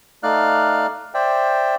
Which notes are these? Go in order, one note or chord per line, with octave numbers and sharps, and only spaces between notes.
A3 D#4 D5 F5 F6 F#6
C5 D5 E5 G5